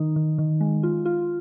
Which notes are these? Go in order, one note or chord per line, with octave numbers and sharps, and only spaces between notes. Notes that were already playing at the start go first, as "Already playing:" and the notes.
Already playing: D#3 D#4
D#3
D#3
G#3
F4
F4